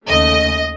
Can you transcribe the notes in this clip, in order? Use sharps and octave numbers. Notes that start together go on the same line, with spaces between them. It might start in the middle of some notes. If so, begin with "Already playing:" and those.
D#2 C#3 A3 D#5